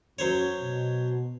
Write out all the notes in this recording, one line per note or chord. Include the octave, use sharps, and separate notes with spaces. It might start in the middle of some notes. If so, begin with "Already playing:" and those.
F#2 F#3 C5 C#5
B2